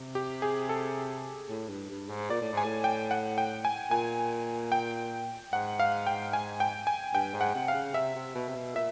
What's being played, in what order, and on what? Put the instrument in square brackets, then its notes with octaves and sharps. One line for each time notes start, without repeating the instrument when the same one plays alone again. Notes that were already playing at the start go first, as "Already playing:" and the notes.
Already playing: [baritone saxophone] C3
[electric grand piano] G4
G#4
A4
[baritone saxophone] A2
G2
G2
G#2
[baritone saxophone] A#2 [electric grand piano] D5
[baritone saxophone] A2
[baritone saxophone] G#2 [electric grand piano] G#5
[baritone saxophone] A2
[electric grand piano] G5
F#5
G5
G#5
[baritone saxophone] A#2 [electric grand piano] G#5
[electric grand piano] G5
[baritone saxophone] G#2 [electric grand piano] F#5
[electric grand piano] F5
G5
G#5
G5
G#5
[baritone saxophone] G2 [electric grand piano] G5
[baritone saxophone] G#2
[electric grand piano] F#5
[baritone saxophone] C3
[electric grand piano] F5
[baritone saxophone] C#3
[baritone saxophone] C3 [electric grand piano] E5
[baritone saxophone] C3
B2
C3
B2
[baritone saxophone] A#2 [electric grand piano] E5